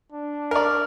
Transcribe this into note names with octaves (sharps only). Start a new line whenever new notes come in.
D4
A#4 D5 F6